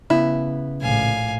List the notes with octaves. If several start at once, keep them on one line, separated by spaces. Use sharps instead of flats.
C#3 B3 E4
A#1 A2 F5 G#5